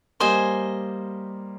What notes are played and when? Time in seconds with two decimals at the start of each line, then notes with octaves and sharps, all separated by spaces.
0.20 G3 A#3 C5 D#5 G#5